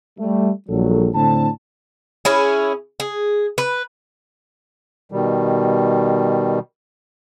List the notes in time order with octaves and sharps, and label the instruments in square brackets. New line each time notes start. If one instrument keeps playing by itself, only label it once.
[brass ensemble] G3 A3
A#1 F#3 G3 A4
A2 D3 C4 D4 A5
[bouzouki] C#4 E4 G#4
G#4
B4
[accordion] B2 D#3 G3